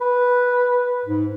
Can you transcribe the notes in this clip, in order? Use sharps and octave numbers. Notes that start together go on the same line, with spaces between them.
B4
G#2